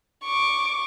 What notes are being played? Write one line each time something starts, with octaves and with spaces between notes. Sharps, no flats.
C#6 D6